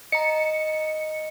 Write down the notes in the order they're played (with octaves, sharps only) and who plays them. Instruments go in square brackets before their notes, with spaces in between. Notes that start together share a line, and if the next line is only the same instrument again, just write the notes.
[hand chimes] D#5 A#5 [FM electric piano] C#7